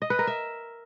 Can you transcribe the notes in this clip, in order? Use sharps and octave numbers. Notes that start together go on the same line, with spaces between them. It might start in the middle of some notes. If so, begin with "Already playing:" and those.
D#5
B4
A#4
E5